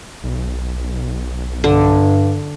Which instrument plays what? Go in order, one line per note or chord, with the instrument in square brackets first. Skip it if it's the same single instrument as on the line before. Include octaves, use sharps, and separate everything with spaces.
[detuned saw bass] B1
[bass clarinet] G2 [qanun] D3